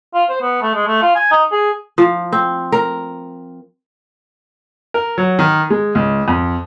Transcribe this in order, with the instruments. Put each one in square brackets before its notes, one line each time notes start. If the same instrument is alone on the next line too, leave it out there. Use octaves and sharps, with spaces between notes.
[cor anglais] F4
C5
B3
A3
G#3
A3
F4
G#5
D#4
G#4
[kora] F3
C4
A#4
[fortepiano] A#4
F#3
D#3
G#3
C#2
F2